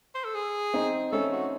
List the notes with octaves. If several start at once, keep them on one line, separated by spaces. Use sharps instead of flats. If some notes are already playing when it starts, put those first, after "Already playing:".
C5
A4
G#4
C4 D#4
A3 C#4 A4
F#4